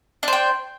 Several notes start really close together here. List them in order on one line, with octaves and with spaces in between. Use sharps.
D4 C5 G5